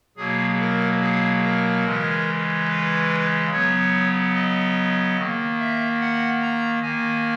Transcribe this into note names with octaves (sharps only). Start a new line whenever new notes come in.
B2 F#3 A#3 G#4
A#4
G#4
A#4
C#3 E3 G#3
B4
C#3 F#3 B3 C#5
D#5
D#3 A#3
E5
F#5
A#5
D#3 A#3 G#5